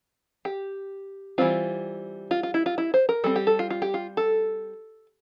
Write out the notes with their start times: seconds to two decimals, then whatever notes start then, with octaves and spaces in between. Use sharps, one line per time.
0.45 G4
1.38 E3 G3 C4 F4
2.31 F4
2.43 F4
2.54 E4
2.66 F4
2.78 E4
2.94 C5
3.09 A#4
3.24 G3 C4 A4
3.36 G4
3.47 A4
3.59 F4
3.70 F4
3.82 G4
3.94 F4
4.17 A4